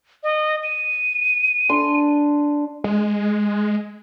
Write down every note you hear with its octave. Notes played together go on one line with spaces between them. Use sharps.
D#5
D#7
D4 C6
G#3